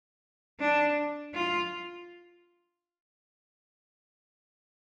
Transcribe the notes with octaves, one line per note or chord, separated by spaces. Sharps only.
D4
F4